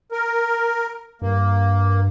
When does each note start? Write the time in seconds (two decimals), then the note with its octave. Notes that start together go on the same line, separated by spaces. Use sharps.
0.12 A#4
1.22 G2 A#3